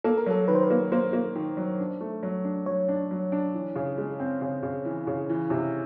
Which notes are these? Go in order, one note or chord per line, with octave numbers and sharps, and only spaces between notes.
A#3 A4
A#4
F#3 A4
D#3 B4
C5
B4
A#3
A#3 C5
A#3
D#3
F#3
D4
A3
F#3
D4
F#3 C#5
D4
F#3
D4
E3
C#3
G#3
C4
C#3
C#3
E3
C#3
E3
C3